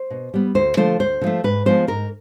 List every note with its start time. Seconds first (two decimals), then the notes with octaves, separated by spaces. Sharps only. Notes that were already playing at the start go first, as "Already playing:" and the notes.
Already playing: C5
0.10 B2
0.34 G3 B3
0.55 D2 C5
0.77 D3 F3 A3 C5
0.99 D2 C5
1.21 D3 F3 A3
1.44 G#2 B4
1.66 F3 G#3 B3 C5
1.87 G#2 A#4